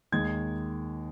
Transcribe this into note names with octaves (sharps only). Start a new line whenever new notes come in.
D#2 D#3 G#3 G#6